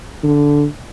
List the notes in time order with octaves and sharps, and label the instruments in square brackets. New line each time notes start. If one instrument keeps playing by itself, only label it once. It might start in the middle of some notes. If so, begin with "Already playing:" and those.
[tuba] D3